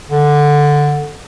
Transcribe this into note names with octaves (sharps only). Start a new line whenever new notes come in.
D3